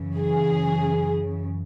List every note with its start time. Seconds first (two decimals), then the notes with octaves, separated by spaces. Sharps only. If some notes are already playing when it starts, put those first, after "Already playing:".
Already playing: F#2 C#3 E3
0.18 G#4